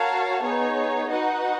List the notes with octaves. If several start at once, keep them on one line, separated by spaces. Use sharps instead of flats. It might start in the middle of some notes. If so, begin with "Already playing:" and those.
Already playing: F#4 A#4 C#5 F5 A5
B3 D#4 G#4 C#5
D#4 F#4 B4 D#5 F#5